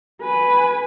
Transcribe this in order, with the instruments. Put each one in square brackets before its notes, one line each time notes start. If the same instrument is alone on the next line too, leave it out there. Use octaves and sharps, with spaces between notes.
[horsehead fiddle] B4 G#5